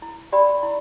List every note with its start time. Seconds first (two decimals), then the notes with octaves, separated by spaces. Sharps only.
0.02 E4
0.32 G4 D5 G5 B5
0.63 E4